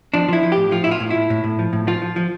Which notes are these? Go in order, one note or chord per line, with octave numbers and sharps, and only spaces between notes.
F3 D4
F3 E4
F3
A2 G4
F3 F4
A2 E4
F4
A2
A2 E4
A2
A2
F3
A2
F3 F4
F3
F3